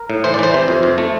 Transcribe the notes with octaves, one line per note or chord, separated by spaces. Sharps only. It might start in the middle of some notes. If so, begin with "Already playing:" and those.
Already playing: A#4
A2
E3 C5
D5
E3 C5
C3
F2
F2
A3